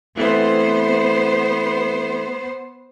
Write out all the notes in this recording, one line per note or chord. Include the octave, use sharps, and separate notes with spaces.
E3 A3 B3 C4 C5